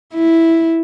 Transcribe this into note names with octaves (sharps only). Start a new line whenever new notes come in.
E4